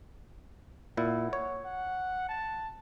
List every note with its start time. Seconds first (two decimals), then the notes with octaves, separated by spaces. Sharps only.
0.97 A#2 E4 F#5
1.33 C#5
1.65 F#5
2.29 A5